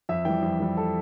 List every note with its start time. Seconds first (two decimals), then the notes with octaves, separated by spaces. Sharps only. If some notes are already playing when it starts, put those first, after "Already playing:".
0.09 F2 E5
0.25 E3 G3 G5
0.42 F2
0.60 E3 G3
0.77 A4